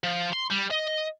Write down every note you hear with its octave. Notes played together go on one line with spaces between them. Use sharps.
F3
C6
G3
D#5